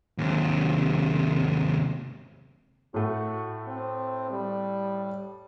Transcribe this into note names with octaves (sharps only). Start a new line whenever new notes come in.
D#2 C3
A2 A3 F#4
C4
G3